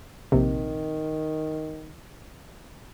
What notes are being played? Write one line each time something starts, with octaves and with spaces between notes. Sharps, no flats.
A#1 C3 D#3